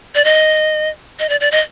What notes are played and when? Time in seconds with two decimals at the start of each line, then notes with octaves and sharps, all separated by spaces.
0.15 D5
0.25 D#5
1.19 D#5
1.29 D5
1.41 D5
1.52 D#5